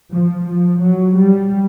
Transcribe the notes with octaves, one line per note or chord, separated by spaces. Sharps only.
F3
F3
F#3
G3